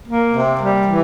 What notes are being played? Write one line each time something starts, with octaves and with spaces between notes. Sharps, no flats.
A#3
C3
G3
E3